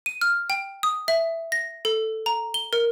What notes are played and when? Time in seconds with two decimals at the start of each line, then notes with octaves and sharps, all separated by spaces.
0.06 D#7
0.21 F6
0.50 G5
0.83 D#6
1.08 E5
1.52 A#6
1.85 A4
2.26 A#5
2.54 G7
2.73 A#4